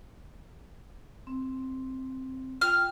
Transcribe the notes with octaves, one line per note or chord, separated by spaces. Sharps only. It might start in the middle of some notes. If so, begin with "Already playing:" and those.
C4
F4 G5 F6